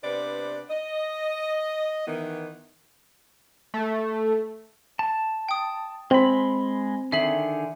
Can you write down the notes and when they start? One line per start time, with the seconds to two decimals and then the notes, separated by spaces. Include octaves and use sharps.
0.03 C3 B3 D4 B4 C5 D5
0.70 D#5
2.07 D#3 E3 B3
3.74 A3
4.99 A5
5.49 G5 D#6
6.11 G#3 C4 B5
7.12 D3 D#3 G#4 E5 F#7